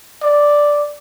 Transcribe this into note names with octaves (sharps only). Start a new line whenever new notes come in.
D5